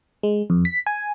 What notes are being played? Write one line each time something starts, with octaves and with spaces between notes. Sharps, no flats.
G#3
F2
B6
G#5